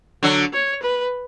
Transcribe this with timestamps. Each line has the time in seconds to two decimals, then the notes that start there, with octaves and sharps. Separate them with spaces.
0.23 D3 F#3
0.53 C#5
0.82 B4